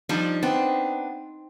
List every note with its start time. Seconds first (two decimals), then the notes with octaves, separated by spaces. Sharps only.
0.09 F3 G3 D4 D#4
0.43 B3 C4 D4